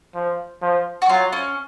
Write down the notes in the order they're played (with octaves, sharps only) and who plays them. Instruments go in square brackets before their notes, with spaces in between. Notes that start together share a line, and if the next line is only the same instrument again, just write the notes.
[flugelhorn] F3
F3
[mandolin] F#4
[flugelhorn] F#3 [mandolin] F4
[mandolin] C#4